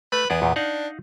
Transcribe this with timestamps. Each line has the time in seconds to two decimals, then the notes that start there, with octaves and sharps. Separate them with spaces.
0.12 A3 B4
0.30 E2 B3 G#4 D5
0.42 E2 A#2 G5
0.56 D4 D#4 F5 F#5